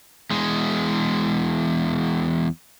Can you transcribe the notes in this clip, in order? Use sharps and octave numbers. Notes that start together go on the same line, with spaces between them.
E2 G#3